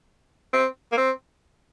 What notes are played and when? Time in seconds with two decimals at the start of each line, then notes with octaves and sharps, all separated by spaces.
0.53 C4
0.92 A#3
0.98 C4